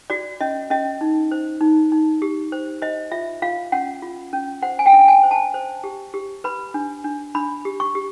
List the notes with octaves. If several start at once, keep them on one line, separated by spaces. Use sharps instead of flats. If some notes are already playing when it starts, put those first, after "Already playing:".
F#4 D5
C#4 D#5
C#4 D#5
D#4
C5
D#4
D#4
G4
C5
C5 D#5
F4 E5
F4 F5
C#4 F#5
F4
C#4
C5 F#5
G#5
G5
D4
G#5
C5
A5
C5
G4
G4
B4 B5
D4
D4
D4 B5
G4
C#6
G4